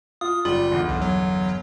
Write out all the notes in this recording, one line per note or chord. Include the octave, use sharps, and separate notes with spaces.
F4 D#6
F#1 G3 F4 F#7
G1 E2
B1
F#3